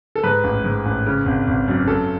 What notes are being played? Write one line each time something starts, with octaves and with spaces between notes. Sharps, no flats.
A4
G#2 B4
A1
G#2
A1
C#3
G#1
G#1
F#2
F#2 A4